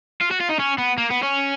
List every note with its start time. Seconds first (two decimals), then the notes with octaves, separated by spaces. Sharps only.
0.21 F4
0.31 F#4
0.41 F4
0.50 D#4
0.60 C#4
0.78 B3
0.98 A#3
1.10 B3
1.23 C#4